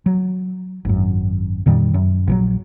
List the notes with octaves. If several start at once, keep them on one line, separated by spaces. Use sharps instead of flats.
F#3
G#1 F#2
F2 A#2 D#3 G3
F#2
A#1 E3 F#3